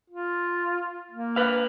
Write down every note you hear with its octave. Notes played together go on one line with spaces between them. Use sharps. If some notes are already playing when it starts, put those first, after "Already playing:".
F4
A#3
B4 F5